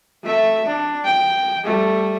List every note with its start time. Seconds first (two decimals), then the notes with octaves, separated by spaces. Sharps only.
0.23 A3 E5
0.66 D4
1.04 G5
1.64 G3 A3